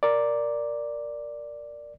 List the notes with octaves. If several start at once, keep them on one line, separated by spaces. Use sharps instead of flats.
A#4 D5